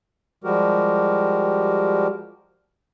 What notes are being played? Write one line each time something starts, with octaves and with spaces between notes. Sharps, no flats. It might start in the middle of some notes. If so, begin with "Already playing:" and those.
F3 G3 G#3 F#4 G4 A#4